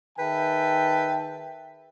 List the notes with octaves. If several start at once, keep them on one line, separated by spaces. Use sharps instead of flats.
D#3 G#4 B4 E5 G5 A5